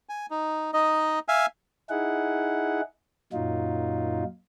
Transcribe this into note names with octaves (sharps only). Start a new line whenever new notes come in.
G#5
D#4
D#4 D#5
E5 F5 G#5
D#4 E4 G#4 F#5
F#2 A#2 F#3 D#4 F4